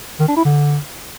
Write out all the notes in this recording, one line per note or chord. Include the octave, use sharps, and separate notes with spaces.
D#3
D4
E4
D3